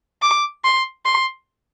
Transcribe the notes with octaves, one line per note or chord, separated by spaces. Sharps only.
D6
C6
C6